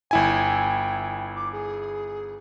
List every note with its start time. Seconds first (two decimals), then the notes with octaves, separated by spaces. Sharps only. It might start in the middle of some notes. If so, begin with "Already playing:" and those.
0.11 G1 E4 G5 G#5
1.36 D6
1.53 G#4